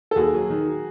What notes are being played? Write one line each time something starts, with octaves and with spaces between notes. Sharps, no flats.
A4
D#2 F#4 G#4
F#3
D#3